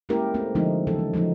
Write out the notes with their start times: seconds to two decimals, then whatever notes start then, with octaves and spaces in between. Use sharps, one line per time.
0.09 G#3 A#3 C#4 E4 G4 A#4
0.34 A3 C4
0.55 D3 F3 G#3 A3 C4 D#4
0.87 C#3 E3 F#3 A4
0.99 G#3
1.13 F3 F#3 A3 D#4